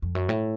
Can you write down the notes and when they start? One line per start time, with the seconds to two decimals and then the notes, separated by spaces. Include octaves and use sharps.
0.02 F2
0.15 F#2
0.29 A2